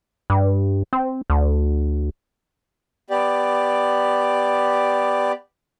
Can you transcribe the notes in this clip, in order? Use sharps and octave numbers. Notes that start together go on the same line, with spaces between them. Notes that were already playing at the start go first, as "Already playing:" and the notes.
G2
C4
D2
B3 G4 D5